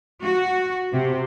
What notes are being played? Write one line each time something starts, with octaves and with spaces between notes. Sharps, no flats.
F#4
C3